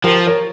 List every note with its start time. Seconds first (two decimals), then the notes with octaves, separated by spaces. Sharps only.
0.04 F3 G4 A#4
0.27 A#4 C#5